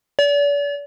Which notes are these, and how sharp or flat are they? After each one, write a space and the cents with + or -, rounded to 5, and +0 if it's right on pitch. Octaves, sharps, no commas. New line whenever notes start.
D5 -40